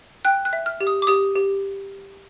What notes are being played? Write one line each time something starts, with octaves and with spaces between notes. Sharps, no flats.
G5 F#6
F#6
E5
F6
G4
D#6
D6
G4 D#6
G4